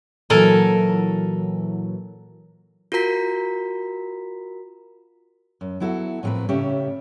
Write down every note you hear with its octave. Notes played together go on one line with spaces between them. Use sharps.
A#2 E3 F#3 A4 A#4 G#5
F4 F#4 A#4 A#5 B6
F#2
F#3 B3 E4 F#4 A4
A2 F3 C4 A#4 B4
A2 C#3 C#4 G4 E5